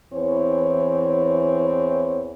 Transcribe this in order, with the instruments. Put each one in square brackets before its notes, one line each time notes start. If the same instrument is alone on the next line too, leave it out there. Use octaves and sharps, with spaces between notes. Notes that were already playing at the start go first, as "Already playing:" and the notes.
[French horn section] E2 E3 C4 C#5